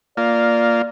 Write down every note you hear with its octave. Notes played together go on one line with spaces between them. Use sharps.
A#3 F4 D5